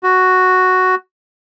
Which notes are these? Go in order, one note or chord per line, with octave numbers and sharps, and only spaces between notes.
F#4